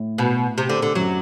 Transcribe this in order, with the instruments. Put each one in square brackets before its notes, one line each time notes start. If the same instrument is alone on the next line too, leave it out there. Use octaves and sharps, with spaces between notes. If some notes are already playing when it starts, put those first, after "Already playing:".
Already playing: [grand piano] A2
[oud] B2
C3
D3
D3
[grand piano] F#2 [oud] F#3